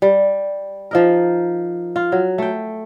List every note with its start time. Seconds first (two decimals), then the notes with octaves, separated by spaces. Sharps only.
0.02 G3
0.91 F3 D#4 A#4
1.96 F4
2.12 F#3
2.38 A3 G5